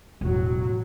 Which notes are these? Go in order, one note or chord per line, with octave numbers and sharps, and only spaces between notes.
E1 A1 F#3